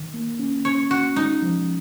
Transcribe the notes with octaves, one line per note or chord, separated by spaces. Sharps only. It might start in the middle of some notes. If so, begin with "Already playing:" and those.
Already playing: D#3
A#3
C#4
C#4 C#5
C#4 F#4
G#3 D#4
F3